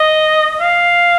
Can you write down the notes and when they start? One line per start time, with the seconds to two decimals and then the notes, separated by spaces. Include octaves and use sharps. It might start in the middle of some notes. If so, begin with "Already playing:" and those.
Already playing: D#5
0.61 F5